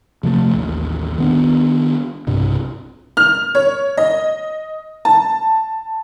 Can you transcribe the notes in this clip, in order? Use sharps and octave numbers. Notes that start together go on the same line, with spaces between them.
C3 F3 F#3 A3
A1 D#2
D#3 B3 D4
B1 G2 C3
F6
C#5
D#5
A5